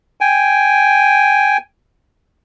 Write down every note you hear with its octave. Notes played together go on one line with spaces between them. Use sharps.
G5 G#5